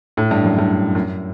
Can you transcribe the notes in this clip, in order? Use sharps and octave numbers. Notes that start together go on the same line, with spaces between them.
A2
G2
F#2
G2
F#2